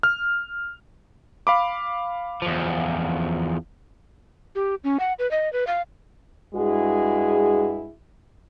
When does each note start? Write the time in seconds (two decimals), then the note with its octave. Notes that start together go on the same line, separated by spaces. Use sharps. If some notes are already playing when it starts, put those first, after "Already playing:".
0.03 F6
1.47 F5 B5 D6
2.42 E2 F3
4.55 G4
4.84 C#4
5.00 F#5
5.19 B4
5.31 D#5
5.53 B4
5.67 F5
6.55 G2 G#3 E4 F#4 G#4